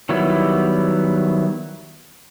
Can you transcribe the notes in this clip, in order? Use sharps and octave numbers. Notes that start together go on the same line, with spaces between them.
D#3 F#3 G3 B3 E4